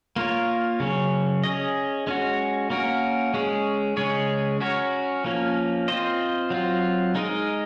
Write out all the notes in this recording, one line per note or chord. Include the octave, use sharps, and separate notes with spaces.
A#3 F4 A#4 C#5
C#3 F#3 C#4
C#4 G#4 D#5
G#3 C#4 F#4
A#3 C#4 F#4 A#4
G#3 C#4 G#4
C#3 G#3 C#4 G#4 C#5
C#4 F#4 A#4 C#5
F3 A#3 C#4
C4 F4 C5 D#5
F#3 C4 F4
G#3 D#4 A#4 D#5